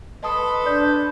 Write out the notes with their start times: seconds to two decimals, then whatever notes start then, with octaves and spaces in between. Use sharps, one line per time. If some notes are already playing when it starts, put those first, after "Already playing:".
0.23 A4 B4 D#5 A5 C6 D#6
0.66 D4 D5 G6